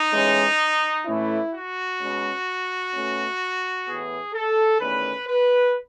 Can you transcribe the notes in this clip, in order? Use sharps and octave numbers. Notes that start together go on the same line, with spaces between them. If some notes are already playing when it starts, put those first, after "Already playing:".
Already playing: D#4
A2 E3 G#3 C#4
A2 E3 A3 C#4 E4
F#4
B2 G#3 C#4
B2 A3 C#4
A2 E3 B3 G#4
A4
E2 D#3 A3 C#4 B4
B4